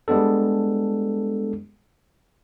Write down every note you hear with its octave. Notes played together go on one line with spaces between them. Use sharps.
G3 G#3 B3 D4 A4